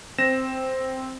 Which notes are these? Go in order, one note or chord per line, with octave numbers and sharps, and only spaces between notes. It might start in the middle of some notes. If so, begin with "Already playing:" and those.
C4 A#6 E7